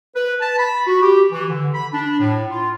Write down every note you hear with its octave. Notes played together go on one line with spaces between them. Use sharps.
B4
A5
B5
F#4
G4
E3
D3
B5
D4
A2
F4